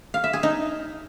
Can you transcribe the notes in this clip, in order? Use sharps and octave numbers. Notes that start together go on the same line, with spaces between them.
F5
E5
G#4
D#4